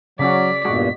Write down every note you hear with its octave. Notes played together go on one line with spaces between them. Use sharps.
C#3 F#3 C#4 F#4 D5 B6
E2 G2 A#2 G#3 F#4